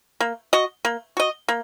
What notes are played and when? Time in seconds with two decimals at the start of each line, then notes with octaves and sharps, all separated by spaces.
0.20 A#3
0.53 F#4 D#5
0.85 A#3
1.17 F#4 D#5
1.48 A#3